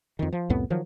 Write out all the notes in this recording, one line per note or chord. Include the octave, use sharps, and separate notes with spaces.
F2 D#3
F3
C2 F2 A2 B3
D#3 F3 F#3